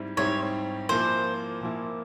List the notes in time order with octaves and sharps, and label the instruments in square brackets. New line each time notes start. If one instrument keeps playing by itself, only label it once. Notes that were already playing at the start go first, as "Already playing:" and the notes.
Already playing: [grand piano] G#2 G3 C4 E4 G4
[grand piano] G#2 G3 C4 E4 G4 [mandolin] C#5
[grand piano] A#2 F3 A#3 E4 [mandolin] C5
[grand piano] A#2 F3 A#3 E4